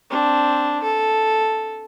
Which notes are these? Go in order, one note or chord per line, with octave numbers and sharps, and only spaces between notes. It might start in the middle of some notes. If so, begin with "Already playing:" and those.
C4 D4
A4